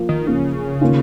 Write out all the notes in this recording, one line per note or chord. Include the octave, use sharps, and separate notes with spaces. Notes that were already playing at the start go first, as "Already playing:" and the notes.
Already playing: F3 A#3 F4
D#3
C#3 F3 A#3 F4
D#3 A#3 C#4 F4